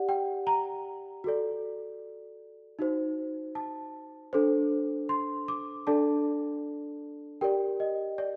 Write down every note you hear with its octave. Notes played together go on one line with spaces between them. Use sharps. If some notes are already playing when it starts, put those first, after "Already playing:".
Already playing: G4 D5 F#5
G5
A#5
F#4 A4 D5
D#4 F#4 C5
A5
D4 A4 C5
C6
D6
D4 A4 D5 A5
G4 A#4 D5 G5
D#5
D5